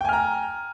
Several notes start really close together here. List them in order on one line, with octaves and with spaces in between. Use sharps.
G5 G#5 F6 A#5